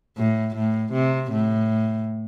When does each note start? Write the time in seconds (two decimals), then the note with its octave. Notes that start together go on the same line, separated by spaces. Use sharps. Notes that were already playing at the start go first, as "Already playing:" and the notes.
0.18 A2
0.55 A2
0.93 C3
1.31 A2